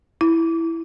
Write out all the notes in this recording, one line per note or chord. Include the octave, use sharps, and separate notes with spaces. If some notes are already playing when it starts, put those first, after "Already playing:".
E4